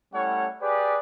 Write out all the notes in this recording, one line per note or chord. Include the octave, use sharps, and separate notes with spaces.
G3 A3 C#4 E4 C#5 F#5
G4 G#4 B4 D5